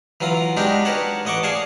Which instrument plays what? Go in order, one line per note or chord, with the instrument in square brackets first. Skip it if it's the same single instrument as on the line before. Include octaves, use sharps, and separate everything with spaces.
[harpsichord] E3 F#3 F4 A#5
G#3 D4 D#4 F#4 G4 A#4
A#4 B4 C#5 F#5 A5
A1 D#5 F#5 C#6 D6
G#4 D5 F5 G#5 A5